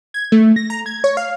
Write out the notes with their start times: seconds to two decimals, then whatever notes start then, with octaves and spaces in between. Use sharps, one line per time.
0.14 G#6
0.32 A3
0.56 A#6
0.70 A#5
0.86 G#6
1.04 C#5
1.17 F5